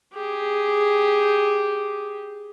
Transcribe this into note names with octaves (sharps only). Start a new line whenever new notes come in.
G4 G#4